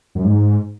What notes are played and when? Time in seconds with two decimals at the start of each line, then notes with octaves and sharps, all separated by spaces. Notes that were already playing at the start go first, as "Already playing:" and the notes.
0.15 F#2
0.24 G#2